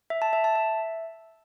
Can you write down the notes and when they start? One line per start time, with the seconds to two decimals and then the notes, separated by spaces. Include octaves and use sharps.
0.10 E5
0.22 A5
0.33 E5
0.44 A5
0.55 E5